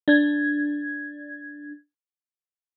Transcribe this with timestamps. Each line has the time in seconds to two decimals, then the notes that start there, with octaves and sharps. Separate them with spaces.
0.08 D4 G#6